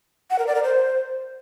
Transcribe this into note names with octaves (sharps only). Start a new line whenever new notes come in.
F#5
A#4
D5
A#4
C5